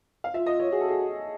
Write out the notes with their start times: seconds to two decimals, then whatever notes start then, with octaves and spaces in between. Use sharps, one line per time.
0.24 F5
0.34 F4 E5
0.46 D#5
0.60 C#5
0.72 F#4 G#4
0.81 A4
0.89 G#4